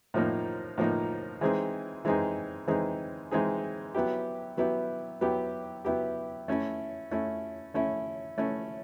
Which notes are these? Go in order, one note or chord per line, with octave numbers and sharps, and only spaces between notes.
A2 F3 A#3 D#4
A2 F3 A#3 D#4
E3 G#3 C4 D#4 G#4
E3 G#3 C4 D#4 G#4
E3 G#3 C4 D#4 G#4
E3 G#3 C4 D#4 G#4
F#3 B3 E4 G4
F#3 B3 E4 G4
F#3 B3 E4 G4
F#3 B3 E4 G4
A3 C#4 E4
A3 C#4 E4
A3 C#4 E4
A3 C#4 E4